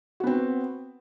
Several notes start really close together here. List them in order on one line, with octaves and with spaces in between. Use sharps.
F#4 B3 C4